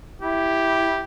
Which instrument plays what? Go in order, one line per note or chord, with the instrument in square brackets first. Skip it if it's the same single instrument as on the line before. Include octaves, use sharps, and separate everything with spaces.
[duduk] E4 [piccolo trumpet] G4